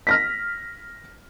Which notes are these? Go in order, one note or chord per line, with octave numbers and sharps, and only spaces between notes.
F6 A#6 B6